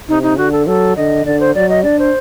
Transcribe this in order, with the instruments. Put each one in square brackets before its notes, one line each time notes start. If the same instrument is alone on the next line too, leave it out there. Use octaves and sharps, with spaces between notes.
[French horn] C3 [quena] D#4
[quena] D#4
[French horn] D3 [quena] F#4
[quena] A4
[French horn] F#3 [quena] A4
[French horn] D3 [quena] D#5
[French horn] D3 [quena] D5
[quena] C5
[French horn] F#3 [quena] D5
[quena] D#5
[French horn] D4 [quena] D5
[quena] C5